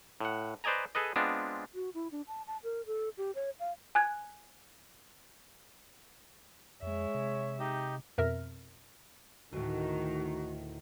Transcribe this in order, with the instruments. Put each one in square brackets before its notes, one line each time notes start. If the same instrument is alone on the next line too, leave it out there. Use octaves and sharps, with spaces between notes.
[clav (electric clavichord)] A2 F#5
B4 C5 D5 D#5 G#5 A#5
G#4 A4 B4 D#5
G#3 B3 C4 D4 F4
[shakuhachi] F#4
E4
D4
A5
A5
A#4
A4
G4
C#5
F5
[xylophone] G#5 F#6 G#6
[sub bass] F2 [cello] G#3 E5 [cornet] C#5
[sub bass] C3
[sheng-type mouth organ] D#4 G4 D#5
[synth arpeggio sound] F2 B2 A#4 E5 F6 A#6
[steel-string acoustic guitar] D2 A2 [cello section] D#3 [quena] F#4